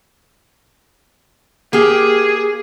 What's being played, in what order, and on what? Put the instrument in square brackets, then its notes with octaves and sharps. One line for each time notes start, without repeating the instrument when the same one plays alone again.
[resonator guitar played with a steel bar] A#3 G4 [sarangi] G#4